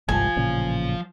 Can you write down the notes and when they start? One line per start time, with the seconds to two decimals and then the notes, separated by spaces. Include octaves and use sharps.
0.09 G1 C2 G#2 F3 F4 G#5
0.36 A1 A#2 C#3